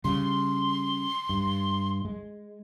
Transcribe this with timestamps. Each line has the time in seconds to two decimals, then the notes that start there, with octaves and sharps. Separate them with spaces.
0.04 C#3 G3 C6
1.29 G2
2.05 G#3